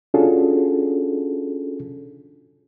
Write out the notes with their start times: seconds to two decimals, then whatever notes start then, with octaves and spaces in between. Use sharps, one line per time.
0.14 C#4 D4 F4 F#4 G#4 A4